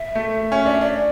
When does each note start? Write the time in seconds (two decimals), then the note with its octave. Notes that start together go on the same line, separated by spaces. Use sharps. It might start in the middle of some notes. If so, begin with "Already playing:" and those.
Already playing: E5
0.15 A3
0.52 C#4
0.66 D4 E5
0.81 D4 D5